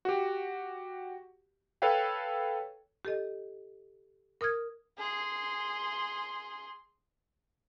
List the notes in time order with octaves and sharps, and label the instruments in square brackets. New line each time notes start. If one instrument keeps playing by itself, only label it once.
[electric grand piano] F#4 G4
A4 B4 C#5 F5 G5
[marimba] G4 A4 D#5
A#4 D#6 F6 G#6
[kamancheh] G#4 C6